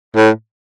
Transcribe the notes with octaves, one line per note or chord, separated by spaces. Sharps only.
A2